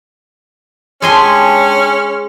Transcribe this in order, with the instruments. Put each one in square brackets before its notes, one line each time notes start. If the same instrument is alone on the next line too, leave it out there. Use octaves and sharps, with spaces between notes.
[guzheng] G#3 G#5 C6 [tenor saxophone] C#4 [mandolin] D4 G4 A4